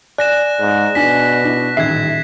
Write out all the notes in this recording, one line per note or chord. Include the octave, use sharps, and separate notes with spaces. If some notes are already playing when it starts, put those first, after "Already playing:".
D5 G#5 F#6 A#6 E7
G#2
B2 D4 G#5 B6
D4 E4
D#1 A1 D#3 E5 G#6 C7